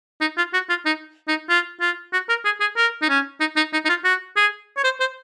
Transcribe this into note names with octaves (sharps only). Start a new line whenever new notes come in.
D#4
F4
F#4
F4
D#4
D#4
F4
F4
F#4
A#4
G#4
G#4
A#4
D#4
C#4
D#4
D#4
D#4
D#4
F4
F#4
G#4
C#5
C5
C5